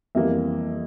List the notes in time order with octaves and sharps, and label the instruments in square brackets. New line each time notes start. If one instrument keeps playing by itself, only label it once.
[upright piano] F2 E3 G3 A#3 E5